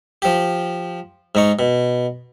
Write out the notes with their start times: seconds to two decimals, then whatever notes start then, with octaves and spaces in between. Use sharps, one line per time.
0.22 F3 G4
1.35 G#2 D#4 C#6
1.59 B2